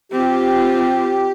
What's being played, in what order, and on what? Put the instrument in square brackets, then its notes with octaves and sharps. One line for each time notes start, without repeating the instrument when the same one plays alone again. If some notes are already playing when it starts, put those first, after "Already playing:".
[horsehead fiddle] C4 F4 [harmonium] G4